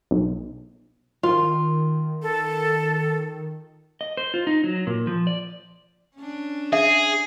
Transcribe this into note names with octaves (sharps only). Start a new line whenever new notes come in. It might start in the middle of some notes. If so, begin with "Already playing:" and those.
B1
D#3 F4
A4
D#5
C5
F4
D#4
F#3
A#2
F3
D5
C#4 D4
G#4 E5